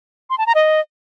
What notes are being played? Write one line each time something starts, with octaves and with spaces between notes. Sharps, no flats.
C6
A5
A#5
D#5